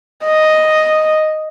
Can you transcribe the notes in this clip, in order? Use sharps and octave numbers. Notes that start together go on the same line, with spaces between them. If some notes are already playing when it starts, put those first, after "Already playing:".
D#5